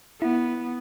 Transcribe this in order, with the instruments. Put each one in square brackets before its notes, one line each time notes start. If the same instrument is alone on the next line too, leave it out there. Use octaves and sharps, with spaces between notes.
[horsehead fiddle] B3 [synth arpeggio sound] E4